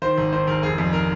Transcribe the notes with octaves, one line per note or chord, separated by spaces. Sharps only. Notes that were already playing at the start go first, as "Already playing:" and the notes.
D#3 C5
G#1
D#3 C5
G#1 A#4
F1 G#4
F2
A#4